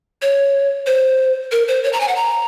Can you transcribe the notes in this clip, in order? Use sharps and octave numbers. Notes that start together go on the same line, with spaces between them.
C#5
C5
A#4
C5
C#5
A#5
G#5
F#5
A#5